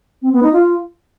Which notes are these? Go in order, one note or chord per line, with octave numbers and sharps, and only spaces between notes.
C4
B3
D#4
F4